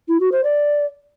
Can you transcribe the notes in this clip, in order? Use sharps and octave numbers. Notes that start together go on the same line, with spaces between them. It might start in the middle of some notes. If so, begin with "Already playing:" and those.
E4
F#4
C5
D5